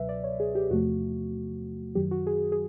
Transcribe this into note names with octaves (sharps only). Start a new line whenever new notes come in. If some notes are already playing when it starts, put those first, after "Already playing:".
Already playing: C#2 B2 F#3 B4 E5
D5
C#5
G#4
G4
E2 C3 F3 A3 F#4
F#2 D#3 F#3 G4
F#4
G#4
G#4